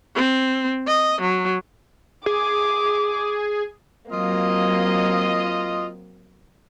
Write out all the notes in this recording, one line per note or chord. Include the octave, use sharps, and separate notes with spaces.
C4
D#5
F#3
G#4 D6
F#3 A#3 C4 F4 D#5